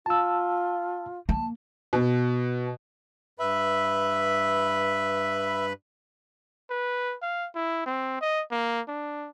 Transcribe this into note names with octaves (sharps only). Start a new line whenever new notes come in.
F4 A5 E6
A#3 A5
B2
G2 B4 E5 B5
B4
F5
E4
C4
D#5
A#3
D4